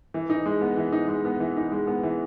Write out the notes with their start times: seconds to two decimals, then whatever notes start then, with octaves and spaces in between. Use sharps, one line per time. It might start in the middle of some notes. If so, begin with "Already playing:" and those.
0.14 E3
0.30 D#4
0.46 G#3
0.61 B3
0.77 E3
0.92 D#4
1.08 G#3
1.25 B3
1.40 E3
1.56 D#4
1.72 G#3
1.87 B3
2.03 E3